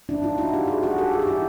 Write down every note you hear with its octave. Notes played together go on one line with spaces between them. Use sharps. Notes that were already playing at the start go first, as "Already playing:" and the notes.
D4 E4
D#4 F4
E4 F#4
F4 G4
F#4 G#4
F#4 G#4
G4 A4
F#4 G#4
G4
E4 F#4